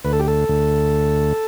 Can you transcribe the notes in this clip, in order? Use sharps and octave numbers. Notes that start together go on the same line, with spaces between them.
D2 B4
A4
G4
A4
D2